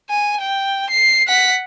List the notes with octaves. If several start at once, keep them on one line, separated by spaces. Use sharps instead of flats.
G#5
G5
C7
F#5 B6